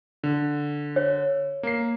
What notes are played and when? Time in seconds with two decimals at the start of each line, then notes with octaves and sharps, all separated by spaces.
0.23 D3
0.96 C#5
1.63 A#3 C7